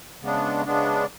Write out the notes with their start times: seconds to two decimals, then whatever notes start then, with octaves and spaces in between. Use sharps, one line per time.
0.21 C#3 G#3 B3 D4
0.65 C#3 G#3 B3 D4